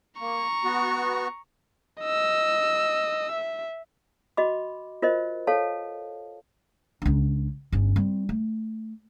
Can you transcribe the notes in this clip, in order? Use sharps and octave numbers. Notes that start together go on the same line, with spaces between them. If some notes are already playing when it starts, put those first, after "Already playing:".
A#3 A#5 C#6
B3 F#4
D#5 E6
E5
F#4 D#5 B5 D6
F4 A#4 C5 D#5
A4 C#5 F5 A5
C#2 D4
G1 C#4
G3 C4
A3